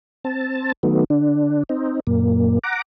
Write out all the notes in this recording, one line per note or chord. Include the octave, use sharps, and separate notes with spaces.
C4 A5
D#3 F#3 A3 B3
D3 D4
C4 D#4
F#2 A#2 A#3
F#5 A#5 D6